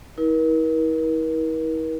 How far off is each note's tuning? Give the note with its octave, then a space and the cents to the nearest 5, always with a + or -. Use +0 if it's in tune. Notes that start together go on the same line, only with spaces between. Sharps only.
E4 -45 A#4 +40